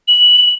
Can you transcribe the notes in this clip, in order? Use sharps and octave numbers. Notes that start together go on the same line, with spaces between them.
F#7